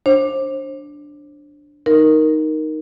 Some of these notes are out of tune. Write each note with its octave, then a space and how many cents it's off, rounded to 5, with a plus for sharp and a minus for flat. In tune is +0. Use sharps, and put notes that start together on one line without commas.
D4 +0 C5 +35
D#4 +0 A#4 +0